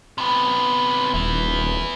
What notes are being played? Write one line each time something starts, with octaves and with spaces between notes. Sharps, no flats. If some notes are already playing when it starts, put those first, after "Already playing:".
C3 B3
D#1 B3 E4